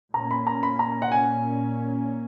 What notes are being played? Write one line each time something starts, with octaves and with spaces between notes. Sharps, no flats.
A#2 A#3 C#4 A#5
B5
A#5
B5
A#5
F#5
G#5